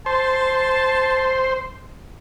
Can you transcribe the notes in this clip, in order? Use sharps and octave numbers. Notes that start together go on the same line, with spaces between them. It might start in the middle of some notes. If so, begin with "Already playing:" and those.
C5 A5